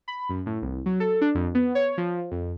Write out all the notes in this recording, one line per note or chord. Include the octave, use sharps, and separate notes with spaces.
B5
F#2
A2
C2
F#3
A4
D4
F2
B3
C#5
F3
F2